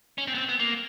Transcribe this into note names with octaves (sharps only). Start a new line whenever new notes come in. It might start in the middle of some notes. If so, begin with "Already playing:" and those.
C#4
C4
B3
C4
B3
A#3